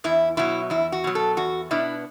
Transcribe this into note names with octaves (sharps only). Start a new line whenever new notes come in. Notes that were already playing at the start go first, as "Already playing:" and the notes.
E2 E4
B2 F#3 E4
E2 E4
F#4
B2 F#3
A4
E2 F#4
B2 B3 D4 E4